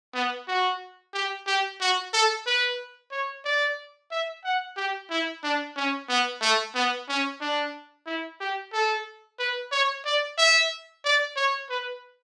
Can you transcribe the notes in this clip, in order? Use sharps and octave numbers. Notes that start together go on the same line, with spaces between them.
B3
F#4
G4
G4
F#4
A4
B4
C#5
D5
E5
F#5
G4
E4
D4
C#4
B3
A3
B3
C#4
D4
E4
G4
A4
B4
C#5
D5
E5
D5
C#5
B4